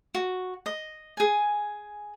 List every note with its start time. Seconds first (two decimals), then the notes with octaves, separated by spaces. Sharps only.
0.15 F#4
0.66 D#5
1.17 G#4 G#5